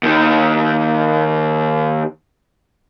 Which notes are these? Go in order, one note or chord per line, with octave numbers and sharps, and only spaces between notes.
D#2 D#3